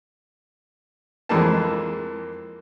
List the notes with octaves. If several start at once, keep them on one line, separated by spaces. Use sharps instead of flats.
F2 E3 G#3 A#3 A5